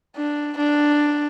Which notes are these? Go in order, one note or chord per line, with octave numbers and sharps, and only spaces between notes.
D4
D4